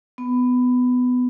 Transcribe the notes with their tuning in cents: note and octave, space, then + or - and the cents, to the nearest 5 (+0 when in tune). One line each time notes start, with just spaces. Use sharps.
B3 +15